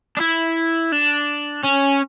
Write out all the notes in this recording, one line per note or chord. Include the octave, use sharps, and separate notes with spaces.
D4
E4
D4
C#4